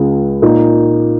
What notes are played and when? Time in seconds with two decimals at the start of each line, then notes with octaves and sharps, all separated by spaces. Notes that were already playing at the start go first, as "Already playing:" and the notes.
Already playing: C#2 C#3 G#3 F4 G#4
0.42 A#2 A#3 D#4 A#4